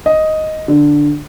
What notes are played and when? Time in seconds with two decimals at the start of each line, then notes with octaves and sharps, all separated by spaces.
0.06 D#5
0.68 D3